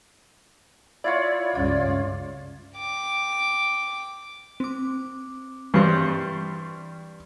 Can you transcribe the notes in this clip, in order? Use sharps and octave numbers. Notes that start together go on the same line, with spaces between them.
E4 F4 C#5 D5
C#2 G2 C#4 F4
G5 D6
C4 D6
G2 E3 G3 C4 C#6